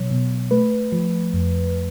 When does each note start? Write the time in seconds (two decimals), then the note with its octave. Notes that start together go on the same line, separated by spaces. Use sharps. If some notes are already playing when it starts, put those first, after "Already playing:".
Already playing: B2 F#3 C#5
0.11 B2
0.51 A3 B4
0.92 F3
1.34 F2